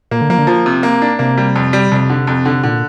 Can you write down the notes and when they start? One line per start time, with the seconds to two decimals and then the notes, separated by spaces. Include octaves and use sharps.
0.11 A#2 A#3
0.21 D3
0.30 F3 A#3
0.38 D3
0.47 F3
0.66 C3
0.83 A#3
1.02 D4
1.19 C3 A#3
1.38 G3
1.56 F2
1.73 G3
1.92 F2 C3
2.10 D3
2.27 F2
2.45 D3
2.63 A#2 D3